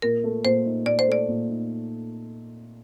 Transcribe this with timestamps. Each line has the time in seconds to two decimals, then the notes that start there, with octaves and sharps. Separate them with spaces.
0.02 A#2 A#4
0.24 A3
0.45 A#2 C5
0.66 D#4
0.86 A#2 D5
0.99 C5
1.08 A3 D5
1.29 A#2
1.49 D#4